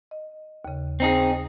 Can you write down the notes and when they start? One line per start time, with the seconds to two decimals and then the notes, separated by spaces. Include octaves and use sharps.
0.11 D#5
0.65 D#2 C#3
1.00 C4 D#4 G#4